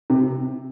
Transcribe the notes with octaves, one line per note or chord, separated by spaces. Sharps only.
C3